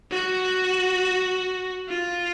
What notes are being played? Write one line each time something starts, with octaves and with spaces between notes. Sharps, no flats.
F#4
F4